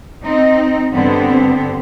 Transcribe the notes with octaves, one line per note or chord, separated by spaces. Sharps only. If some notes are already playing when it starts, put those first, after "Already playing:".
C4 D#4
G2 D3 B3 C4